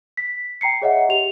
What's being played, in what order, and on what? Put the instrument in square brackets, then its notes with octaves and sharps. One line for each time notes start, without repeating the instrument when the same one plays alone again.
[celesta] B6
G5 A#5 C7 C#7
G#4 C#5 D#5 E5 F#5
G4 F7